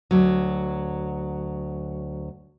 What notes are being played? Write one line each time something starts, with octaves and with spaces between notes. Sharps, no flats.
D2 F#3